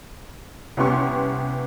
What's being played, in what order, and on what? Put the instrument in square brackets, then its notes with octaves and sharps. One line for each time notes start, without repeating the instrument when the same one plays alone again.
[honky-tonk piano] C2 B3 C#4 G4 C6 C#6